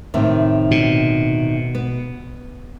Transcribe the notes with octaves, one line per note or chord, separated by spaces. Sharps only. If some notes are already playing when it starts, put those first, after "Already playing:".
A2 C3 D#3
B2
B3